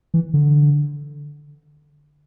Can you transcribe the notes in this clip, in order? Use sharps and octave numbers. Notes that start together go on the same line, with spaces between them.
E3
D3